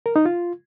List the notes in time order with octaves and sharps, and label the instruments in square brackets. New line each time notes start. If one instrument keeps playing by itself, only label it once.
[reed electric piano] A#4
D#4
F4